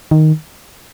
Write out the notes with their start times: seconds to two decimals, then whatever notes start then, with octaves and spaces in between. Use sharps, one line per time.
0.11 D#3